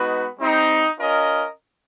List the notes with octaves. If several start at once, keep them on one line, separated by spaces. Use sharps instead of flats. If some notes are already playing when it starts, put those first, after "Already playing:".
Already playing: G#3 B3 D#4 F#4 B4
G3 C4 D#4
C#4 F4 A#4 D#5